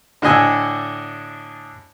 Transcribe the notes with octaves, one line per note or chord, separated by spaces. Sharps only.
A2 D3 D4 D#5 G#5 E6